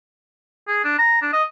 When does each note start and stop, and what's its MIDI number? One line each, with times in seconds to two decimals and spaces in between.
0.68 0.84 68
0.84 0.95 62
0.98 1.20 82
1.22 1.29 62
1.33 1.43 75